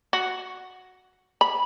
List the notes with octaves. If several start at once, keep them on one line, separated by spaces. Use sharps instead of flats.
F#4
B5